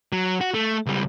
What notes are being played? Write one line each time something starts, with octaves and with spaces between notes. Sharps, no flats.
F#3
F#4
A3
C#2 G3